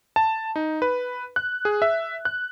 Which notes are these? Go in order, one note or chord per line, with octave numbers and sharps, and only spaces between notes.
A5
D#4
B4
F#6
G#4
E5
F#6